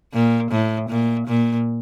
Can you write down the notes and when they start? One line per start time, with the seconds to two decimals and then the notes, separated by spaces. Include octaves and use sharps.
0.13 A#2
0.51 A2
0.90 A#2
1.28 A#2